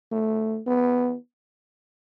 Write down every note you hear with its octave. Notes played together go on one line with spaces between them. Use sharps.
A3
B3